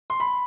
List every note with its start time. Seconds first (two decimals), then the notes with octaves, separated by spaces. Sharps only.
0.10 C6
0.20 B5